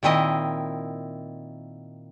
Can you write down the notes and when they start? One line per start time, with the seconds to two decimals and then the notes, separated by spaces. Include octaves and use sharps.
0.03 A#2 D#3 C4 E4 D#5